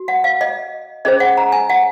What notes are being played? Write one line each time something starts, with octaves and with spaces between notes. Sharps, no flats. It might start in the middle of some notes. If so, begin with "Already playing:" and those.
Already playing: F#4
F#5
F5
D#5
C#4 G#4 C5 D#5
F#5
A#5
G#5
F#5